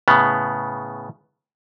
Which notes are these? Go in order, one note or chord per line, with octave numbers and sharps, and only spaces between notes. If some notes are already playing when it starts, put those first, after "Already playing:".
A2 C#3 B3